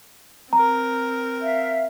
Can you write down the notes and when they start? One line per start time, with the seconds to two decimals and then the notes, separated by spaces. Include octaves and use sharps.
0.53 C4 A#4 A#5
1.41 E5 F5